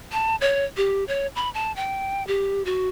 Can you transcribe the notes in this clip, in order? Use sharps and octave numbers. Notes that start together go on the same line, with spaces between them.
A5
C#5
G4
C#5
B5
A5
G5
G4
F#4